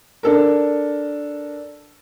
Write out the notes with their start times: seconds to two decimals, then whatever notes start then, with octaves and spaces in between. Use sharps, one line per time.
0.23 D4 A4 A#4